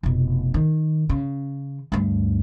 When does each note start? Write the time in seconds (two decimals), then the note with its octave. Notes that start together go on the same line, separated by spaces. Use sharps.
0.03 F1 B2
0.54 D#3
1.09 C#3
1.92 D2 G2